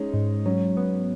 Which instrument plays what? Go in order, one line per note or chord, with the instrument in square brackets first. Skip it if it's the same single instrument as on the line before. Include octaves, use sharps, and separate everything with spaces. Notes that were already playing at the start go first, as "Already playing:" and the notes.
Already playing: [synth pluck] G#3 [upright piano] C#4 D#4
[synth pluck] G#2
[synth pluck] F#3 [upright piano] C#4
[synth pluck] B3